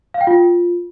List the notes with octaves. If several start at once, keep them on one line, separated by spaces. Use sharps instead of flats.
F5
G5
F4